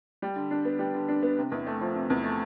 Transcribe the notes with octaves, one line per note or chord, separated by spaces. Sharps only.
G3
D3
D4
B3
G3
D3
D4
B3
C3
E2
A3
F3
C3
E2
A3